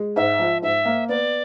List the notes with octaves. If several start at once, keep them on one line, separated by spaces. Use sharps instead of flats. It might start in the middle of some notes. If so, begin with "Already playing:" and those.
Already playing: G#3
G#2 E5
F3
G#2 E5
A#3
B3 D5